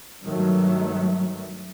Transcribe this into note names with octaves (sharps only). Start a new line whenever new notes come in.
G2 D#3 F#3 A3